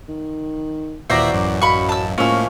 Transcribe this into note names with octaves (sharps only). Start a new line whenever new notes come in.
D#3
D#2 A#2 E3 F#4 C5 D5 E5 A#5
A1 F#2
F#3 D#5 F5 B5 C#6
A5 E6
C#2 A2 F3 A#3 C#4 G#5 C#6 E6